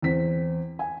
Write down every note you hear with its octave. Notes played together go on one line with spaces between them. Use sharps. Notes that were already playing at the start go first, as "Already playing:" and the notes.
E2 C4 B6
G#5